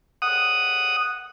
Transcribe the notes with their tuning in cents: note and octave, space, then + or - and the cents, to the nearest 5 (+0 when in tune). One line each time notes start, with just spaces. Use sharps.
F#5 +0 D#6 +0